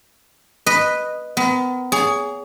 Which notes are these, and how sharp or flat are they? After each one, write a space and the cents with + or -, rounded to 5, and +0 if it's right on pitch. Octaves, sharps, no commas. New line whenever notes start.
B4 +0 D#5 -10
B3 +35 A#4 +30
G#4 +0 C#5 +35